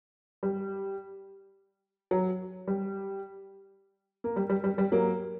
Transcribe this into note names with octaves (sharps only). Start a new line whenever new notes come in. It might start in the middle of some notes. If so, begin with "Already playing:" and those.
G3
F#3
G3
A#3
G3
G3
G3
G3
F#3 A#3